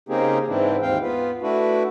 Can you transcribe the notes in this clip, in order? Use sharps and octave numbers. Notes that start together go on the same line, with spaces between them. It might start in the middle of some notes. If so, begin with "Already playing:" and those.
C#3 A#3 C4 D#4 G4 G#4
G#2 E3 C4 D4 E4
D#2 G#2 C4 F5 G5
B3 F4 B4
A3 D4 E4 F#4 B4